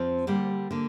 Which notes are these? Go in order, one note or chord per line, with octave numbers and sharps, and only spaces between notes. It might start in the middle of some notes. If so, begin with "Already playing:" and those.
Already playing: F2 F3 C4
D3 G3 A#3 G4
D3 A#3